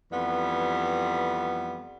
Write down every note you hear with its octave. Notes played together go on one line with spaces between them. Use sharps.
F2 E3 G3 B3